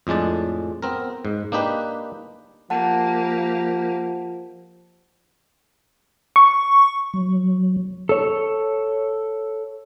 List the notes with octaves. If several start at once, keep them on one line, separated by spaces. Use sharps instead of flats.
F2 A2 G#3 D4 A5
B3 C4 A#4
G#2
A#3 D4 D#4 G4 B4
F3 A#3 G4 F#5 A5
C#6
F#3
A4 C#5